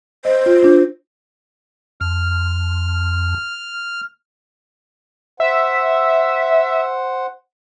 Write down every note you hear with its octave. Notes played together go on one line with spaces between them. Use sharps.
C5 D#5
F4
D4 F4
F2 F6
C5 E5 F#5